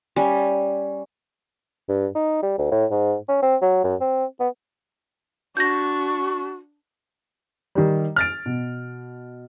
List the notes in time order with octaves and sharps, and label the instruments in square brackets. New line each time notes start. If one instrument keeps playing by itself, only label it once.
[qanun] G3 C#4
[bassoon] G2
D#4
G3
D2
A2
G#2
C#4
C4
F#3
F#2
C4
B3
[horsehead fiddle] D4 [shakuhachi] F#4 [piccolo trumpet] C#6 [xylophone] G6 A#6
[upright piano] D#3 G3
F6 A6 D7
B2